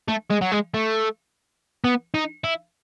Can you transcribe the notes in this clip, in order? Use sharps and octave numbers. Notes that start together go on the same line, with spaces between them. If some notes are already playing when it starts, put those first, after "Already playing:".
A3
G#3
F#3
G#3
A3
B3
D#4
E4